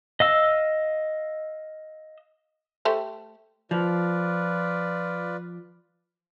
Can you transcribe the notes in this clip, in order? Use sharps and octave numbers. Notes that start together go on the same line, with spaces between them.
D#5 F5 E6
A3 G4 C5
F3 F4 B4 D5